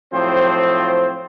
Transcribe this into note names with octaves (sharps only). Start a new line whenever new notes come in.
A2 F3 F#3 C4 C5